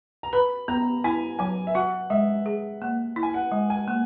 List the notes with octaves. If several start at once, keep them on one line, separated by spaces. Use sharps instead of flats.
A#5
B4 B5
B3 A#5
E4 G#5
F#3 G#5
E5
F#4 F#5
G#3 E5
G#4
A#3
E4
G#5
F#5
G#3
G#5
A#3